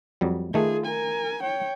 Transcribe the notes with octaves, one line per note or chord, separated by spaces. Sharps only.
F2 F#3 G3
D#3 A3 F4 G#4
A#4 G#5
C#5 G5